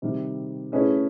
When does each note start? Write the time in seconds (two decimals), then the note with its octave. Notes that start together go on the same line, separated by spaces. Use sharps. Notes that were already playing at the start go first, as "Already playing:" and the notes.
0.02 C3 D#3 G3
0.72 A3 C#4 E4 G#4 B4